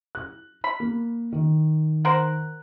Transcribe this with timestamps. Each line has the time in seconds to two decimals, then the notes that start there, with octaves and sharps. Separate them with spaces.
0.15 F#6
0.64 B5
0.80 A#3
1.32 D#3
2.05 A#4 C5 F#5